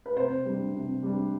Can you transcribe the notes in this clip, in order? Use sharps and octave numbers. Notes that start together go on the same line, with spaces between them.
B4
C3 C5
G3 D4
C3
G3 D4